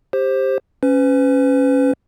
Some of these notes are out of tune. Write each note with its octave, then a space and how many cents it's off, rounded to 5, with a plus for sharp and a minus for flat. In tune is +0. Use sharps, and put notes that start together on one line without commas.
G4 +10 C5 +15
C#4 -5 B4 +35